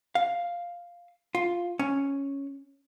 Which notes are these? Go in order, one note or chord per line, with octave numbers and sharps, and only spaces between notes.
F5
F4
C#4